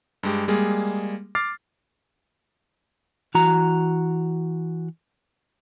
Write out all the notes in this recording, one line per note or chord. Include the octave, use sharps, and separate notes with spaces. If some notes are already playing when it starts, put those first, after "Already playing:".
G2 G#3 G4
G3 G#3 A#3 G#4
D6 F6 A6 C7
E3 F#4 A#5